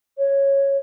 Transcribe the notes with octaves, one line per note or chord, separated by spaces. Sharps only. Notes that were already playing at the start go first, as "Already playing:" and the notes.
C#5